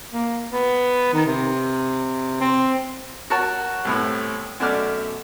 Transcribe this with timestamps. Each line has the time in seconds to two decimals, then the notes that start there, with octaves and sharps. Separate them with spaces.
0.12 A#3
0.53 B3
1.14 D#3
1.26 C3
2.41 C4
3.30 F#4 A#4 C#5 A5
3.85 C2 A2 B3
4.60 F#2 B2 A3 D5 F6